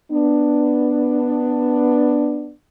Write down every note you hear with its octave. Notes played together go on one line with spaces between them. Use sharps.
B3 D4